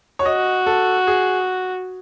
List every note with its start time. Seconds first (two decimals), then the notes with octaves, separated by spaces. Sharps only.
0.19 C#5
0.25 F#4 D#5
0.66 A4
1.07 G#4